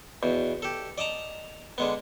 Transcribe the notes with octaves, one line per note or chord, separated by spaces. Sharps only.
E2 B2
G4 A4
D5 D#5 A5 A#5
D3 G#3 B3